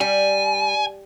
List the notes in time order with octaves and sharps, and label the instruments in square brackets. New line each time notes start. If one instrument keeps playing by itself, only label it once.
[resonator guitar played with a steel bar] G3 [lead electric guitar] G#5